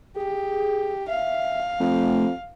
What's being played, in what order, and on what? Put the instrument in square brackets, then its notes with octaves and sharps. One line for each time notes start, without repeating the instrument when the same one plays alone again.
[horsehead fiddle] G4 [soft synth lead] G#4
[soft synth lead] E5 [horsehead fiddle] F5
[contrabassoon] F2 [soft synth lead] A3